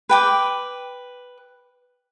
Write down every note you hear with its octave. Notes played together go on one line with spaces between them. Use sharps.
B4 G5 D6